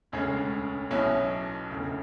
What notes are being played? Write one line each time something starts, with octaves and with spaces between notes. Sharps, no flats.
E1 D2 C#3 G#3 C#4
B1 B2 F#3 C#4 E4
E1 D2 C#3